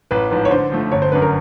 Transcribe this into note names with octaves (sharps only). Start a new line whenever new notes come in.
A1 B4
G#2 F3 B4
C#5
D3 C5
F3 A3
G1 C#5
C5
F#2 D3 B4
A#4